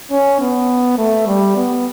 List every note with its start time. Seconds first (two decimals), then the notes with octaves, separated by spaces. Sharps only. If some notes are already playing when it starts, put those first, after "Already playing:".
0.11 C#4
0.40 B3
0.98 A3
1.27 G3
1.56 B3